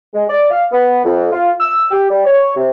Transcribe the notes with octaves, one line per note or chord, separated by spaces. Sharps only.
G#3
D5
F5
B3
F2
F4
E6
G4
G3
C#5
C3